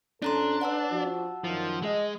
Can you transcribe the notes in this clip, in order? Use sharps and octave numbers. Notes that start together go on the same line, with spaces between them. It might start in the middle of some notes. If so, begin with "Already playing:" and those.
F2 C#4 D4 A4 A#5 C6
C#4 B4 D5 F#5 A5 E6
F3 F#4
F#2 D#3 F3
G#3 D#5